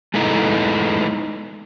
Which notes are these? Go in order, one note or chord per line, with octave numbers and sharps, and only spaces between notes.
G#3 A3 B3 D#4 E4 A4